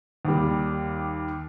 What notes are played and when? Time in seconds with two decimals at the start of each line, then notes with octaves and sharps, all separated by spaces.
0.25 D#2 G3